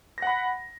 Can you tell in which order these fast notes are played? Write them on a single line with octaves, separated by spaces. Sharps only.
A#6 F#5 B5